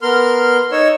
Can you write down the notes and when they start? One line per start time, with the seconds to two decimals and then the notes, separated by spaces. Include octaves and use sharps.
0.02 B3 A#4 C6 F6
0.72 D#4 C#5 E6